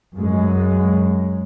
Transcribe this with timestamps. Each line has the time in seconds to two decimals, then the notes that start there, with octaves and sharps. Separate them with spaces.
0.16 F#2 G#3